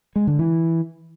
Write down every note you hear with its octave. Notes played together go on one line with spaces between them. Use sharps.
G#3
D3
E3